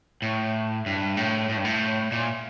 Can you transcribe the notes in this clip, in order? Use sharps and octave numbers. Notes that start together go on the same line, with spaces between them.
A2
G2
A2
A2
G2
A2
A#2